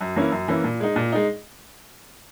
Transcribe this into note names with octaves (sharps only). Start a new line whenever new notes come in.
F#2
E3 A#3 C#4 E4
F#2
E3 A#3 C#4 E4
A#2
G#3 D#4
A#2
G#3 D#4